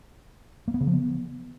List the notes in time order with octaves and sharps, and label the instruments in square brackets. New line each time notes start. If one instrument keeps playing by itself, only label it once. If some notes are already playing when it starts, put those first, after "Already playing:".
[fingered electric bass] A#3
B3
C#3
F3
B3